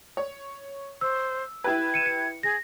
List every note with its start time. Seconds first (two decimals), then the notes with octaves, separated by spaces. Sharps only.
0.17 C#5
1.01 C5 E6
1.64 E4 G4 B4 G#6
1.94 C#7 D#7 E7
2.06 C#7
2.43 G#4 A#6